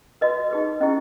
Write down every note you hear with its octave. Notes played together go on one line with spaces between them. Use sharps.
F#4 B4 D#5
D#4 G#4 B4
C#4 E4 G#4 D#5